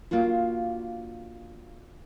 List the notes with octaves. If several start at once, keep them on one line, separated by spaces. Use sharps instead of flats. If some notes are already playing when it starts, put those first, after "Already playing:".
A#3 D4 F4 F#4